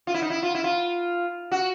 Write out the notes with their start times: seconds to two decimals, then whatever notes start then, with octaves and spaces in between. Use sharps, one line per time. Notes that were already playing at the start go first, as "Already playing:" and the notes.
0.07 F4
0.14 E4
0.22 D#4
0.30 E4
0.43 F4
0.55 E4
0.64 F4
1.51 F#4